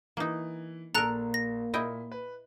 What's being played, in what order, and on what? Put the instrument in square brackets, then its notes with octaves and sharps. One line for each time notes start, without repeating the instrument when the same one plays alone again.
[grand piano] E3 [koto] A#3 D#4
[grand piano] A#1 [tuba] A#3 [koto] A4 A#4 [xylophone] A#5 F#6 F7
[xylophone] A#6
[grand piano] A#2 [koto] E4 D#5 G5
[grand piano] B4